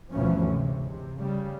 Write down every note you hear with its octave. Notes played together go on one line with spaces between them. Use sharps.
D2 G2 B2 E3 F3 C#4
C3 G#3
C3
C#3 G3